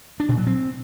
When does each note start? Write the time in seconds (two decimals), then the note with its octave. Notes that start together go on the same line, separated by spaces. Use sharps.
0.20 D4
0.29 A#2
0.38 F#3
0.47 C4